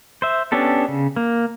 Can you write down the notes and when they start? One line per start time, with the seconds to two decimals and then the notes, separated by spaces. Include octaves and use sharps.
0.22 C5 E5
0.52 B3 C#4 D4 G4 A4
0.88 C#3
1.16 A#3